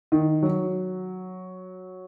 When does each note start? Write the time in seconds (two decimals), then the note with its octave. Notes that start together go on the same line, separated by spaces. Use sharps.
0.12 D#3
0.43 F#3